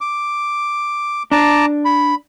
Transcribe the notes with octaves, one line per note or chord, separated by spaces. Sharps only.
D6
D4 A5 A#5 D6
B5